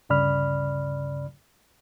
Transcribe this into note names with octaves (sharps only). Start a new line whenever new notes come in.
D2 G2 C#3 D5 B5 F6